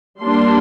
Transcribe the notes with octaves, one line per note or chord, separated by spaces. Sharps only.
G3 A#3 D4 C6